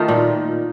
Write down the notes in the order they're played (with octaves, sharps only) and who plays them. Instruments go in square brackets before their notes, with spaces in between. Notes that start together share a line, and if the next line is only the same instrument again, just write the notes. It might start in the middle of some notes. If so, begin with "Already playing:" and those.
Already playing: [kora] D#3 A3 D#4 F4
A#2